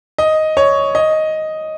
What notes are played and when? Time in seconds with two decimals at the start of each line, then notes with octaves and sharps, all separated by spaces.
0.18 D#5
0.57 C#5
0.95 D#5